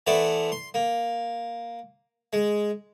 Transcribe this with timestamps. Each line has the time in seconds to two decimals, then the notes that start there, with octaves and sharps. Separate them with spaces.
0.07 E3 A3 B3 C5 D5
0.52 C6
0.74 A#3
2.33 G#3